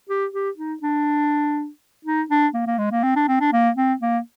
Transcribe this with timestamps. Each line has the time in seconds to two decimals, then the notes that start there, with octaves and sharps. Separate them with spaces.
0.09 G4
0.33 G4
0.57 D#4
0.83 D4
2.05 D#4
2.30 D4
2.54 A#3
2.67 A#3
2.78 G#3
2.91 A#3
3.03 C4
3.16 D4
3.28 C4
3.40 D4
3.53 A#3
3.76 C4
4.01 A#3